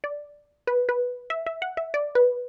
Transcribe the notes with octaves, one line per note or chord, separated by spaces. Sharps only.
D5
B4
B4
E5
E5
F#5
E5
D5
B4